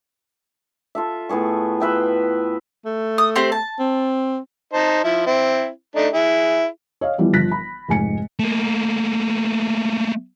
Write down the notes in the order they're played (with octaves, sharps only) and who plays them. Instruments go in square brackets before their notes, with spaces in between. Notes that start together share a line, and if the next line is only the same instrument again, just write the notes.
[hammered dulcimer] F4 A4 E5
A2 B3 G#4 C#6
F4 B4 E5 G5
[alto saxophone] A3
[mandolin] D#6
C4 G4 C5
A5
[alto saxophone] C4
[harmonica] D#4 C5 A5
F3 E4
C4 E4
A3 D4 D#4
E4 G#4
[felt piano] C#5 D#5 F5
E3 F3 G3 B3
G1 F3 F#6 A#6 B6
B5
F1 G#2 G#5 C#7
[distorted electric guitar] A3 A#3